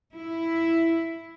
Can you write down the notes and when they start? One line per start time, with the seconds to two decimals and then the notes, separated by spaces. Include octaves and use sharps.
0.13 E4